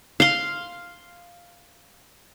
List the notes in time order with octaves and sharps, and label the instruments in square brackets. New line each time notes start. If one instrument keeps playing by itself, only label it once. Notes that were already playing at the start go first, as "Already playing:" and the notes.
[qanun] F5 C6